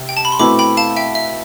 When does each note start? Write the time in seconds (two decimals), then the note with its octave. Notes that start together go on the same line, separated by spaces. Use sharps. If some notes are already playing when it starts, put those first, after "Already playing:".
Already playing: C3
0.09 G5
0.17 A5
0.25 B5
0.32 C6
0.39 B2 A3 C4 E4 B4 B5 D6
0.59 G5 B5
0.77 F5 A5
0.96 E5 G5
1.15 E5